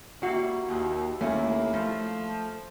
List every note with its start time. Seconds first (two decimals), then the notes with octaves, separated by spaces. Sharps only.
0.23 G3 A#3 E4 F#4
0.68 D#2
1.21 D#2 A3 A#3 C#4 E4
1.74 F3 A3